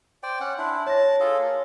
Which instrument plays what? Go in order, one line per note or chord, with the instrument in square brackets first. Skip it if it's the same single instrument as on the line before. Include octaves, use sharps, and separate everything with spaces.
[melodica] C5 D5 G5
C#4 F#5
[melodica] D4 E4 [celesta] C6
[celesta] C#5 A#6 [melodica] A5
[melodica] F4 G#4 A4
A#3